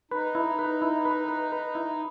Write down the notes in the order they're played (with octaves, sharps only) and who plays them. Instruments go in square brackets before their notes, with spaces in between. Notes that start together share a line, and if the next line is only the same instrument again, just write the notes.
[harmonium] D#4 [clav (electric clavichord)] B4
[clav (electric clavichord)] E4
B4
E4
B4
B4
B4
E4